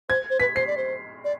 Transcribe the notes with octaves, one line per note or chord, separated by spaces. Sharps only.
C5 G#6
C5
B4 B6
C5 C7
D5
C5
D5